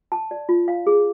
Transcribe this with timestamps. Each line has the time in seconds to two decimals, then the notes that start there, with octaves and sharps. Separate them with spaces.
0.12 A5
0.31 D5
0.49 F4
0.68 F5
0.87 G#4